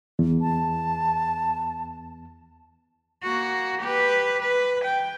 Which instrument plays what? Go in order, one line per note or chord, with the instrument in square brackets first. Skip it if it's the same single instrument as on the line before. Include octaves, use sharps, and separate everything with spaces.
[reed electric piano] E2
[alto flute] A5
[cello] A#3 F#4
G4 B4
B4
G5